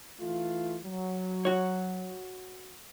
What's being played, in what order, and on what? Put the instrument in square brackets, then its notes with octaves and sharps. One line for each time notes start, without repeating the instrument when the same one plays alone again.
[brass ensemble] E3 A3 F4
F#3
[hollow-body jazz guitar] F#4 C#5